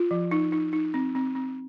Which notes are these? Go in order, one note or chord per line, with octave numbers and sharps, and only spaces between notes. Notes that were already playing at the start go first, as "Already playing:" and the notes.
Already playing: F4
F3
D#4
D#4
D#4
C4
C4
C4